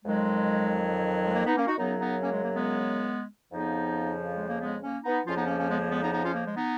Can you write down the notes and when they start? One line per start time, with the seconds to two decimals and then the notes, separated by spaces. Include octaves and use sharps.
0.04 F2 D#3 F#3 G#3
1.25 G#3
1.34 A#3
1.46 B3 D#4
1.56 A#3 C#4
1.67 D#4 F#4
1.78 F#2 C#3 F#3 B3 D#4
2.00 B3 D#4
2.22 A#3 C#4
2.33 G#3
2.44 A#3
2.54 G#3 B3
3.52 F2 C#3 F3 B3 D#4
4.36 G#3
4.48 A#3
4.60 G#3 B3
4.82 A#3 C#4
5.04 B3 D#4
5.26 F2 C#3 F3 C#4 F4
5.37 B3 D#4
5.47 A#3 C#4
5.58 A#3 C#4
5.69 G#3 B3
5.80 A#3
5.90 G#3 B3
6.02 B3 D#4
6.12 B3 D#4
6.24 C#4 F4
6.34 A#3
6.46 G#3
6.56 B3 D#4